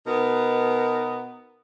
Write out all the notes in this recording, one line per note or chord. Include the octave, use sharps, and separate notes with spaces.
B2 B3 D#4 A#4